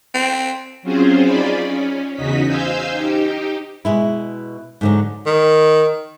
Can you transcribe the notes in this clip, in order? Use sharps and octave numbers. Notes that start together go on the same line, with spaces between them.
C4
F#3 C4 C#4 F4 G#4 C5
D#4 F4 G#4 D5 B5
C#4
E2 C#3 D#4 F#4 D#5 B6
C5 F5 G#5 E6 G6
D#4 G4
B2 G#3 E4
G#2 D3 F#3
D#3